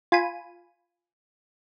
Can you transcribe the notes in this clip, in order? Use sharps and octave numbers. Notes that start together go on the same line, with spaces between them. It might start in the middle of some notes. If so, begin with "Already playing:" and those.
F4 G#5 B5 D#7